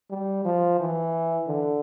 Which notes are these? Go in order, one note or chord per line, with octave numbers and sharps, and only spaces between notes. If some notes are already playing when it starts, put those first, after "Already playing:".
G3
F3
E3
D3